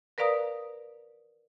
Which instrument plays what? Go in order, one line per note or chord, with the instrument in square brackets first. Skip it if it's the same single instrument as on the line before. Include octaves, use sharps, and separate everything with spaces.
[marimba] A#4 B4 D5 F5 A#5 D#6